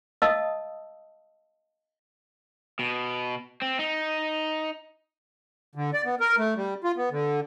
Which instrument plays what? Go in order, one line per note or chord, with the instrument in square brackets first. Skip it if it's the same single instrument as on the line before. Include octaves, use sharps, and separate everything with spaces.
[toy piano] D#5 F5 A5 D#6 E6
[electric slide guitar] B2
C4
D#4
[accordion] D3
D5
B3
A#4
A3
G3
F4
B3
D3